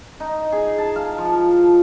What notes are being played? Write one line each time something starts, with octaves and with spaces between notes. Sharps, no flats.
D#4
G#4
A5
F5
F3